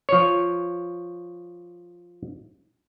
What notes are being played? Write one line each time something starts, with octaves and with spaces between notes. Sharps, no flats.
F3 C#5